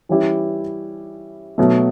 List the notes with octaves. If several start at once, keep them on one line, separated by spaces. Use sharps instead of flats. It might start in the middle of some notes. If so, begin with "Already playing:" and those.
E3 G3 C#4 E4 G4
B2 F#3 A3